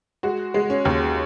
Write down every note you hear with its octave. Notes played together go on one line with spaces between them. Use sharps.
G#3 F#4
G#3
C#4
D#2